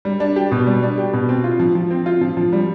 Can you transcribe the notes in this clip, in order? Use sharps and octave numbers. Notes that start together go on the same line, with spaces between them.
G3
D4
G4
B2
G3
D4
G4
B2
C4
F4
F3
F3
C4
F4
F3
F3
G3